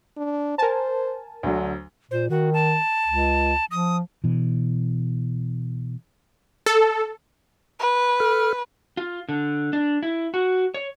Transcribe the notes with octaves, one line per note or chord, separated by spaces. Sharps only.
D4
A#4 C5 G#5 A5
D2 D3 F#3
A#2 C5
D#3 F#4
A5
C#2
F3 D#6
B2 E3
A4
B4
A4 F6
F4
D3
D4
E4
F#4
C#5